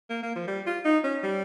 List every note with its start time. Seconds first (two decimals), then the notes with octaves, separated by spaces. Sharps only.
0.10 A#3
0.23 A#3
0.35 F3
0.47 G3
0.66 F4
0.85 D#4
1.04 C#4
1.23 G3